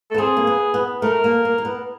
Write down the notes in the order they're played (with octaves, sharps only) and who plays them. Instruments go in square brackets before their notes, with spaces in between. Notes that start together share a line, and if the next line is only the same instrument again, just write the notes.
[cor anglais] A4
[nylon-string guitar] B3
[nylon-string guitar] C4 [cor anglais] G#4
[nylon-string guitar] A#3
B3
B3
[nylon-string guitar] A3 [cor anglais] A#4
[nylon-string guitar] A#3
A#3
A#3
B3